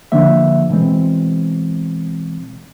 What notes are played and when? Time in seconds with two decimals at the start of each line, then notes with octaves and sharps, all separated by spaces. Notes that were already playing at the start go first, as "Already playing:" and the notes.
0.12 D3 F3 A#3 E5
0.70 B2 E3 G#3 C4